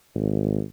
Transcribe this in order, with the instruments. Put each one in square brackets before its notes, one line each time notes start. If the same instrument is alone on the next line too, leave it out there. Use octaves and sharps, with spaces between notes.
[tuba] G#1